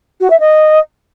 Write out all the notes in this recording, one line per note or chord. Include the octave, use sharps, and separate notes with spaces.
F#4
E5
D#5